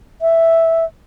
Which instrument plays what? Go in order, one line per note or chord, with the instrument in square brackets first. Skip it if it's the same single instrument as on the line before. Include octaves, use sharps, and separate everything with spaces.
[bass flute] E5